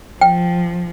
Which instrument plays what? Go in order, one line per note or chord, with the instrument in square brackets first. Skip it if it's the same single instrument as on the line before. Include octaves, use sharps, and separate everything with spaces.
[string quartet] F3 [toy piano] G5